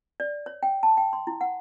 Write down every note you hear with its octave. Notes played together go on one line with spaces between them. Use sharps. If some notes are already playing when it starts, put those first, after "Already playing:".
D5
C#5
G5
A5
G5
C6
E4
F#5